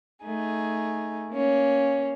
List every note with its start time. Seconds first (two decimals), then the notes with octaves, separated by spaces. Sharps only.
0.24 A3 D#4 G#4
1.32 A#3 C#4